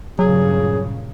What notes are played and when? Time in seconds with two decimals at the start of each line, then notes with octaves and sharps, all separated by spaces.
0.19 G2 A#2 C#3 F#3 G#4